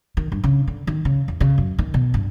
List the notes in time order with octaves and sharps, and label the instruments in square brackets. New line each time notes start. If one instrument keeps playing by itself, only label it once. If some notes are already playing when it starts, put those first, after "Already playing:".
[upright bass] D#3
G2
C#3
D3
D#3
C#3
E2
C#3
F#2
D#3
B2
G2